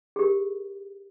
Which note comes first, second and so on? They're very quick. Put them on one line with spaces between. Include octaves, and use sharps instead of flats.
G#4 G4 A#4